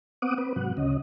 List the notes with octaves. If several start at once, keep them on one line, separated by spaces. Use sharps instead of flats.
B3 C4 F#5 D6 D#6
C4 B4
G#2 C3 F#3 F#5
D2 C#3 C#4 D#5